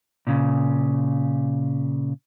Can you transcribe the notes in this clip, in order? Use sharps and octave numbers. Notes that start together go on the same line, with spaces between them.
A#2 C#3